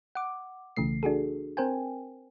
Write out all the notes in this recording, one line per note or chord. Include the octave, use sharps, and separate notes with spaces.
F#5 D6
B1 C#3 E3 A3 C7
D4 F#4 G#4 A4
C4 A#4 C5 G5 G#5